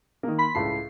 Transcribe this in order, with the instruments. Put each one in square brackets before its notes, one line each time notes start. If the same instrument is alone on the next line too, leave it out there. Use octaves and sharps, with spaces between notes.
[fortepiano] D#3 A#3
[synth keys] B5 C6 B6
[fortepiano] C#2 A2 A5 [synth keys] C7